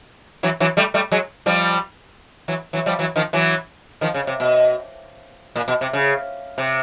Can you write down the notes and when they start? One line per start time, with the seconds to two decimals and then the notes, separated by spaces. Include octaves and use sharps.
0.43 E3 F#3
0.60 E3 F#3
0.77 G3 A3
0.94 G3 A3
1.12 F#3 G#3
1.46 F3 G3
2.48 E3 F#3
2.73 E3 F#3
2.86 F3 G3
2.99 E3 F#3
3.16 D#3 F3
3.33 E3 F#3
4.01 D#3 F3
4.15 C#3
4.27 C3
4.40 B2
5.56 A#2
5.68 B2
5.81 C3
5.93 C#3
6.58 C3